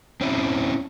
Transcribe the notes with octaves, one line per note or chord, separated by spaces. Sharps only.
C4 C#4 E4